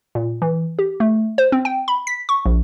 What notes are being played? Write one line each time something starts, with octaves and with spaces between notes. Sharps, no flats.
A#2
E3
G4
A3
C5
C4
G5
B5
B6
C#6
A#1